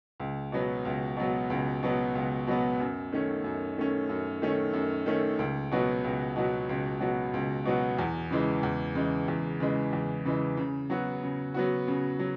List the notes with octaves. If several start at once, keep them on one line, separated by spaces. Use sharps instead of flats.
C#2
B2 F#3 B3
C#2
B2 F#3 B3
C#2
B2 F#3 B3
C#2
B2 F#3 B3
F#2
D#3 A3 C#4
F#2
D#3 A3 C#4
F#2
D#3 A3 C#4
F#2
D#3 A3 C#4
C#2
B2 F#3 B3 F#4
C#2
B2 F#3 B3 F#4
C#2
B2 F#3 B3 F#4
C#2
B2 F#3 B3 F#4
E2
C#3 E3 G#3
E2
C#3 E3 G#3
E2
C#3 E3 G#3
E2
C#3 E3 G#3
C#3
F#3 B3 F#4
C#3
F#3 B3 F#4
C#3
F#3